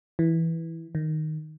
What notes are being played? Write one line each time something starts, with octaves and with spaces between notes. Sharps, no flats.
E3
D#3